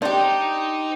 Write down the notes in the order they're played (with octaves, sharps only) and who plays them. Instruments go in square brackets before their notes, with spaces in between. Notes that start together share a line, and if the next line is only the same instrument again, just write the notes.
[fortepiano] D4 [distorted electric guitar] D#4 [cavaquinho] G4 C5